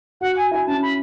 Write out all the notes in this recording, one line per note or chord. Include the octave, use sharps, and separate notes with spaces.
F#4 F#5
G#5
E4 G#5
C#4 A5
B5